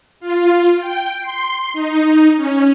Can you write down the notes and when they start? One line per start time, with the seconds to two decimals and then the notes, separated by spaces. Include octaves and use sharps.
0.20 F4
0.80 G5
1.20 C6
1.73 D#4
2.36 C#4